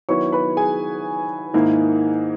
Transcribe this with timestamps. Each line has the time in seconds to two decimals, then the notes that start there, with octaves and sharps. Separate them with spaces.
0.09 D#3 F#3 B3 E4 C#5 C#6
0.32 B4 B5
0.57 G#4 G#5
1.54 G#2 D#3 A#3 E4